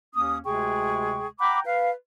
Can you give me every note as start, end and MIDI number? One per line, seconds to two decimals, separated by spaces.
0.15 0.38 39
0.15 0.38 58
0.15 0.38 61
0.15 0.38 87
0.45 1.27 38
0.45 1.27 48
0.45 1.27 56
0.45 1.27 68
0.45 1.27 79
0.45 1.27 85
1.40 1.60 78
1.40 1.60 79
1.40 1.60 82
1.40 1.60 83
1.40 1.60 86
1.66 1.91 71
1.66 1.91 77